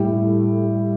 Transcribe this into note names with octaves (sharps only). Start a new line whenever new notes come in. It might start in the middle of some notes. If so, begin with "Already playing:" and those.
Already playing: A2 G3 E4 G4
A3
G3